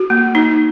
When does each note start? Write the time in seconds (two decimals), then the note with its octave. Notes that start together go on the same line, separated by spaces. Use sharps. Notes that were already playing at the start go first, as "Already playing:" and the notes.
Already playing: F#4
0.10 A#3
0.35 D#4